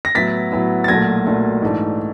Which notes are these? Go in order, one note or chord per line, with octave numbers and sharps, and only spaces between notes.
A#6
A2 F#3 B3 E4 A6 B6
A2 F#3 B3 E4
A6
B1 A#2 F#3 A3 G#6 A#6
B1 A#2 F#3 A3
G#2 E3 A3 D4